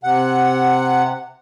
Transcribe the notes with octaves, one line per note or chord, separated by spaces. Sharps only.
C3 F#5